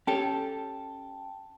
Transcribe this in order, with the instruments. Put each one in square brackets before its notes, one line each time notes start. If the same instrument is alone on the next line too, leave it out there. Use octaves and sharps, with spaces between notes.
[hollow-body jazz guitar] C#4 G4 A4 [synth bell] G5 A5